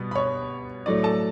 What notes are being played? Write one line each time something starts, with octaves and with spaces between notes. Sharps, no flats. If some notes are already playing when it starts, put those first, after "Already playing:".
Already playing: B2 G3 B3
B5
C#5 C#6
A2 F#3 A3 D5
A4 A5